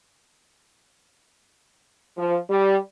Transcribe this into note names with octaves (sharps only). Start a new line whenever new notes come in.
F3
G3